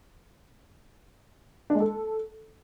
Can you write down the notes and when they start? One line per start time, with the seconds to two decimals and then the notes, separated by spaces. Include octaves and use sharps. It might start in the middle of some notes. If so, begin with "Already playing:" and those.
1.70 D4
1.75 G#3
1.80 A4